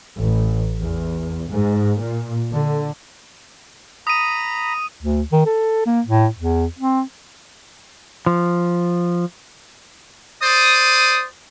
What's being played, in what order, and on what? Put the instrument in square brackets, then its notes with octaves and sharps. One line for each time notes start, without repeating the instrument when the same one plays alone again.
[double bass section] A1
E2
G#2
A#2
D3
[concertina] A#5 B5 [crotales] D#6 D#7
[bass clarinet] D2
D#3
A4
A#3
A2
E2
C4
[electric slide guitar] F3
[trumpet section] C5 D5 D#6